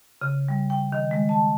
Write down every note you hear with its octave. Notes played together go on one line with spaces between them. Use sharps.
C#3
G3
G5
D#3
G#3
A5